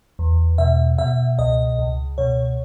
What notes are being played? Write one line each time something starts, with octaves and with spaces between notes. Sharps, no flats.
E2
B2 E5
B2 E5
C#2 D#5
C#2
B2 C#5